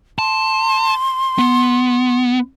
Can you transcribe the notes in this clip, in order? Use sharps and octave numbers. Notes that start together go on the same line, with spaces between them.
A5 C6
B3